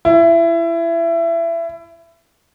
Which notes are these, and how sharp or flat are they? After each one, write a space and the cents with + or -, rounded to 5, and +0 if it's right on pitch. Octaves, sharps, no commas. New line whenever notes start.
E4 +25